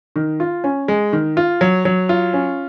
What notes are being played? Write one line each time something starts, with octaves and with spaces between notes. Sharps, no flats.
D#3
F4
C#4
G#3
D#3
F4
F#3
F#3
F4
C#4